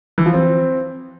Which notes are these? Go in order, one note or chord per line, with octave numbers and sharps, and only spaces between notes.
E3
F3
C4